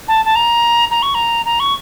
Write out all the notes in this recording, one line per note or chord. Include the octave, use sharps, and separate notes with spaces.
A5
A5
A#5
A#5
C#6
A#5
A#5
C#6